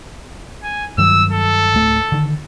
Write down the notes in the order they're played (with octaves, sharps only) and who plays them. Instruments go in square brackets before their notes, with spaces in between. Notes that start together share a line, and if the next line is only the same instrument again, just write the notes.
[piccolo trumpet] G#5
[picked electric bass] G2 D#3 F#3 [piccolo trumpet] E6
[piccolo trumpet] A4
[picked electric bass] D1 A3
D3 D#3